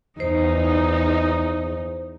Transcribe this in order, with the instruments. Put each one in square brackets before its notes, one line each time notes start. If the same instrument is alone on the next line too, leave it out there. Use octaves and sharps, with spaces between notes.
[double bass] E2 [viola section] D#4 [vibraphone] C5